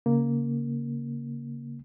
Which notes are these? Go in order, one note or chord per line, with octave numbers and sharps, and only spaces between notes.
C#3 A#3